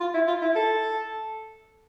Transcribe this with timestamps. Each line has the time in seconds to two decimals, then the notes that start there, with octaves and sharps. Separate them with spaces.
0.01 F4
0.14 E4
0.28 F4
0.42 E4
0.56 A4